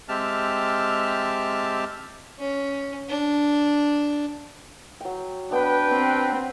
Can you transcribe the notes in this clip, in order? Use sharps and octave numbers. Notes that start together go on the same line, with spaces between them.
G#3 C4 G4 E5 A5 F6
C#4
D4
F#3 G5
B3 D4 B4 G5
C4